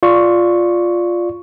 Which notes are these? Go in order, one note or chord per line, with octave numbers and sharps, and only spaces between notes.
F4 D5 C#6